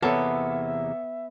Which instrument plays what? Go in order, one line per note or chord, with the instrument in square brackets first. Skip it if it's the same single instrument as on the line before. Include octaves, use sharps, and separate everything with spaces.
[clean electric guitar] E2 C3 A#3 [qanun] B3 [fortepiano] A4 C#5 A5 [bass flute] E5